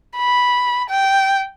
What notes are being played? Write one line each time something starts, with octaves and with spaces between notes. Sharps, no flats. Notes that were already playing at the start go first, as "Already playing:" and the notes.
B5
G5